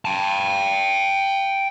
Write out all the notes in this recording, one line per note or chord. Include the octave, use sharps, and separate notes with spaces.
G5 A5